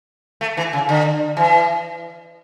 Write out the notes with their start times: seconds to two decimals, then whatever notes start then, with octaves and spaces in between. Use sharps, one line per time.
0.41 A3
0.57 E3
0.73 C#3
0.89 D3
1.37 E3